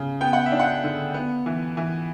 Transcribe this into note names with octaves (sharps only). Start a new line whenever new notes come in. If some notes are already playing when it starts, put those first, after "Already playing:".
Already playing: C#3
B3 G5
F#5
E5
D4
F#5
D3
B3
E3
E3